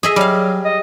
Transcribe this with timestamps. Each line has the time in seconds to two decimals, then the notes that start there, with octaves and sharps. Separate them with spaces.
0.03 G#4 D#5 E5
0.16 F#3 G3 F5
0.65 D#5